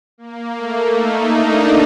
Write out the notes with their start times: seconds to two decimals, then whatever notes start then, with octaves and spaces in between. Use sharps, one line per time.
0.18 A#3
0.57 A3
0.96 D#4
1.35 D4